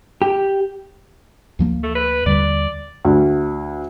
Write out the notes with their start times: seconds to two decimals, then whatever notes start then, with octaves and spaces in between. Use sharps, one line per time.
0.22 G4
1.59 D2 F3 A#3
1.83 A3
1.95 B4
2.26 D#2 D3 G3 D5
3.05 D2